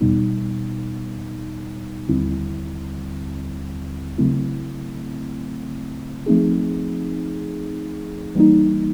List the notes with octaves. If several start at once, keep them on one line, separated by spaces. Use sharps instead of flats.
E2 B2 G3 B3 D#4
D#2 D3 G3 C4 E4
C#3 F#3 A3 C4 E4
F3 A3 C4 D#4 G#4
E3 G3 A#3 D#4